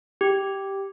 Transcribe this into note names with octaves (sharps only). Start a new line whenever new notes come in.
G4